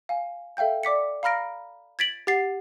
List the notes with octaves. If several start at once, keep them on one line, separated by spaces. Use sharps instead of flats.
F5 G#5
A4 E5 F5 G5 G6
D5 D6 B6 C#7
F5 A#5 B5 F6 A#6 D7
G#6 A6 B6 D7 F#7
G4 F#5 A6 C7